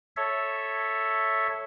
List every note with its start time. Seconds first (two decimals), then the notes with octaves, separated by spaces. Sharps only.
0.17 A4 C#5 E5